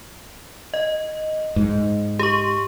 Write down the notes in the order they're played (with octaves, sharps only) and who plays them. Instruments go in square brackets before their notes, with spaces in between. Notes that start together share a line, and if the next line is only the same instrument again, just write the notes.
[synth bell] D#5
[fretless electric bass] G#2
[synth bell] G4 C#6